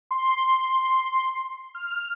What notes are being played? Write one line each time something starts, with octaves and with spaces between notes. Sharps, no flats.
C6
F6